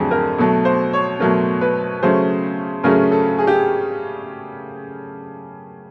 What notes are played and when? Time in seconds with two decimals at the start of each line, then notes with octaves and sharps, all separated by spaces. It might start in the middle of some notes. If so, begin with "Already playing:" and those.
Already playing: F2 D3 F#3 A3 C4 G4 G#4
0.11 A#4
0.38 B2 F#3 A3 A4
0.65 C5
0.93 C#5
1.20 B2 F#3 A3 A#4
1.61 B4
2.02 C#3 F#3 A3 C#4 C5
2.84 C#3 F#3 A3 C#4 A#4
3.12 A4
3.39 G#4
3.47 G4